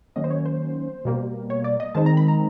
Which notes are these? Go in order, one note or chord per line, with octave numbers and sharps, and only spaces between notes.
D#3 F#3 A#3 C#4 D#5
C5
C#5
C5
B2 G3 A#3
C#5
D5
D#5
D#3 G#3 C4 D#4 A5
A#5
B5
A#5